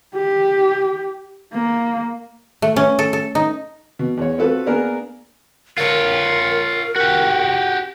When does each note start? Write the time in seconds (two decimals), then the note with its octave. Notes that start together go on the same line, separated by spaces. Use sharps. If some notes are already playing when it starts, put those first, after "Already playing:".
0.15 G4
1.53 A#3
2.62 A3
2.76 C#4
2.99 A4
3.13 A4
3.35 D#4
3.99 B2
4.17 E2 C#5
4.38 C4 F4 F#4 A4 B4
4.66 A#3 B3 D4 G#4 A#4
5.78 F4 A#4 C#5
6.96 F#4 G4